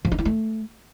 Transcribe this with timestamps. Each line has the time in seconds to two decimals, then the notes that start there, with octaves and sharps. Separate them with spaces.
0.05 F3
0.12 D#4
0.18 E4
0.25 A3